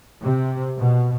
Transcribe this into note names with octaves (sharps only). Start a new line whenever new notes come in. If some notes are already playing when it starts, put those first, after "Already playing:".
C3
B2